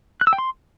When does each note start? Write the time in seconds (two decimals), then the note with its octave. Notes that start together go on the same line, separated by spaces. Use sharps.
0.21 F#6
0.27 E6
0.33 G5
0.38 C6